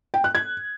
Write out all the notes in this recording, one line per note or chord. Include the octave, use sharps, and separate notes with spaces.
G5
F#6
G#6